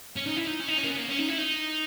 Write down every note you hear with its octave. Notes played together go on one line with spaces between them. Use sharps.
C#4
D#4
E4
D#4
C#4
D#4
C#4
A#3
B3
A#3
C#4
D#4
E4
D#4